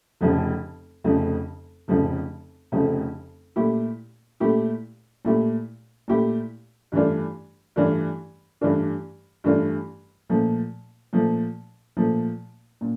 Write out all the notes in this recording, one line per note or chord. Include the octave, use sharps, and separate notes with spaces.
F1 F2 C#3 F3 A3
F1 F2 C#3 F3 A3
F1 F2 C#3 F3 A3
F1 F2 C#3 F3 A3
A#2 A3 E4 G4
A#2 A3 E4 G4
A#2 A3 E4 G4
A#2 A3 E4 G4
G2 E3 A3 D4 F4
G2 E3 A3 D4 F4
G2 E3 A3 D4 F4
G2 E3 A3 D4 F4
A#2 F3 A3
A#2 F3 A3
A#2 F3 A3
A#2